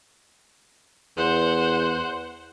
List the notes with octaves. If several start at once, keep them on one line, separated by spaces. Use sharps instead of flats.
E2 C5 F#5